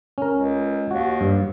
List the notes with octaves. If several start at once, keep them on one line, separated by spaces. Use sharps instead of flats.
C#4 A#4
C#2
D#2 F#4
G2